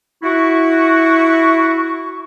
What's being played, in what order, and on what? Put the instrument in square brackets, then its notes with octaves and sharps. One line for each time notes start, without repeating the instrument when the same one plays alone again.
[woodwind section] E4 F#4 C#6